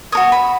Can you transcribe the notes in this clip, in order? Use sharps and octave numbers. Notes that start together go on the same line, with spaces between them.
F#4 A#4 C#5 D#6
B5